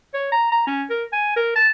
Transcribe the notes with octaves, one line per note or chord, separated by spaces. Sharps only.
C#5
A#5
A#5
C#4
A#4
G#5
A#4
A5